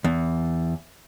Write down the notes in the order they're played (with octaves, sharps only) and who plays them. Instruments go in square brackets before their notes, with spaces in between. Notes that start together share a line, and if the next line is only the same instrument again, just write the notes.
[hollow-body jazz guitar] E2